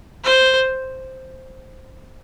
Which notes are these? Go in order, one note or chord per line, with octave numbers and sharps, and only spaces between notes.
C5